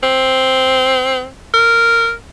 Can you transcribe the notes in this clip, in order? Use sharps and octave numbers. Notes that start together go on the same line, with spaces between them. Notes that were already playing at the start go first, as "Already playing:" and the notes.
C4
A#4